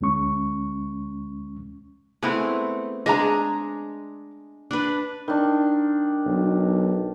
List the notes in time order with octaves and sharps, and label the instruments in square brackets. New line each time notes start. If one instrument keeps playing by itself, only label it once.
[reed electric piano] D2 G#3 C#4 C#6
[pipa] G#3 E4 [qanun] A3 B3 C4
[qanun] G#3 D4 G#4 [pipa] D#5 A#5
[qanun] D4 B4
[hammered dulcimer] D#3 D4
[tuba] B1